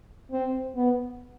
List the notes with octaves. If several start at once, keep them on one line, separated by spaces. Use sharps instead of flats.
C4
B3